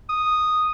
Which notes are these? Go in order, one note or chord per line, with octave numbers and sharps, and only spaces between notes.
D#6